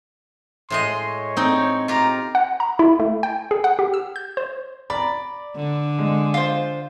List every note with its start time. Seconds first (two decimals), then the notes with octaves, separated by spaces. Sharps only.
0.70 A2 G#3 D#5 C6
1.05 C#5
1.37 C4 D#4
1.88 F4 G4 A#5
2.35 F#5
2.60 A#5
2.79 E4
2.99 A3
3.23 G5
3.51 G#4
3.64 F#5
3.79 G4
3.94 E6
4.16 G6
4.37 C5
4.90 D5 A#5 B5
5.56 D3
5.99 G#3
6.34 F4 C5